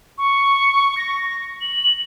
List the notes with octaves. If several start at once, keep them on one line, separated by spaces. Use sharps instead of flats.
C#6
A#6
F#7